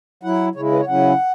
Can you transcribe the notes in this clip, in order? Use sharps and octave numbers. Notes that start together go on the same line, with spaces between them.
F#3 E4 F#5
C#3 G#3 E4 C#5
B4
C#5
C#3 F#3 C#4 E4 F#5